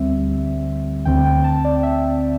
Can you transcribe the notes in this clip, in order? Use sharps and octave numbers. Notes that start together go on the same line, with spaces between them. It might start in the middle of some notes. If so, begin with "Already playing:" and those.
Already playing: D2 D3 G3 C4 E5
D2 D3 C4 G5
G5
A5
D5
E5